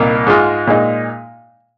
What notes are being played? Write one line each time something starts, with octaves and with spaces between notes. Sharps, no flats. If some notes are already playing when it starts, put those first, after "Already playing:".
Already playing: C2 A#2 A#3 D#4
G#2 G#3 F4
A#2 G#3 D#4